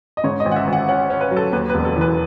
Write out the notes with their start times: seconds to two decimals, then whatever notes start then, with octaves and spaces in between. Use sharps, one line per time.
0.17 D#5
0.24 G#2 C#5
0.40 D#5
0.45 G#1
0.52 F#5
0.56 E5
0.67 G#1
0.73 F#5
0.88 C#4 F#5
1.10 C#4
1.21 B4
1.31 F#3
1.37 A4
1.52 D#2 B4
1.70 E1 B4
1.85 A4
1.96 E3
2.01 B4